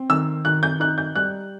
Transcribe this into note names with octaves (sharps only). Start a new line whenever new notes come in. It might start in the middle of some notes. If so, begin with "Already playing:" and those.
Already playing: C4
D#3 E6
D#3 F#6
G6
D#4 F#6
G6
G3 F#6